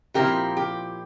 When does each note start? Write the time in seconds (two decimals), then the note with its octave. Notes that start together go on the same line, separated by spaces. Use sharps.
0.14 A#2 F3 C4 E4 G4 A#4
0.57 G4